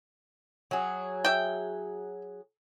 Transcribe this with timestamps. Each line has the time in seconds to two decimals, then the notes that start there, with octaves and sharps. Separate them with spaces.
0.71 F#3 G#4
1.25 E5 G5